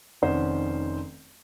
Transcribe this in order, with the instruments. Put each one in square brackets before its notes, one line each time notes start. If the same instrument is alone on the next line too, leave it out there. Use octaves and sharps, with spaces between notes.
[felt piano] F1 D#3 C#4 C5 D5 F#5